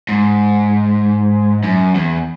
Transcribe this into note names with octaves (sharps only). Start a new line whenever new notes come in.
G#2
F#2
E2